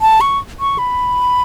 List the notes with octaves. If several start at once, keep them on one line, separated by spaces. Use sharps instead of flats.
A5
C#6
C#6
B5